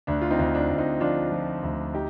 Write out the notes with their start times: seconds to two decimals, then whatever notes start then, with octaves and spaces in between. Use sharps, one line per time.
0.07 D2 D4
0.22 F4
0.30 C4 D#4
0.39 D2
0.55 D4
0.70 D2
0.78 C4 D#4
1.00 F3 D4 F4
1.32 F3
1.63 D2
1.94 D#4 G4